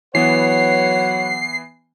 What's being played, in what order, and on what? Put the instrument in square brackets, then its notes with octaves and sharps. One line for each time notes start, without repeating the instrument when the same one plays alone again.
[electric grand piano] E3 B3 [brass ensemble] F#3 B4 F#5 [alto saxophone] C#5 [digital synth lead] C7